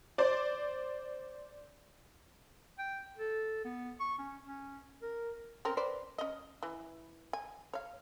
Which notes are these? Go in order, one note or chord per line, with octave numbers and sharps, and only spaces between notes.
C5 D5
G5
A4
B3
C#6
C#4
C#4
A#4
C4 C#4 A#4
B4 C5 D5
C#4 D#5
E3
G#5
C#5 F5